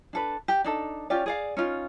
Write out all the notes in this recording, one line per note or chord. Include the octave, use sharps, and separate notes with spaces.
D4 A4 B4
G4
D4 D#4 A4
C#4 F4 G4 D5
G#4 D5 F5
C#4 D#4 F4